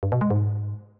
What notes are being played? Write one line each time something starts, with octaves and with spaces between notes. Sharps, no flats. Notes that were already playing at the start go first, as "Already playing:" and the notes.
G2
B2
G#3
G#2